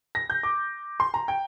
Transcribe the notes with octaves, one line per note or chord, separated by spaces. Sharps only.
A#6
G6
D6
C6
A#5
G5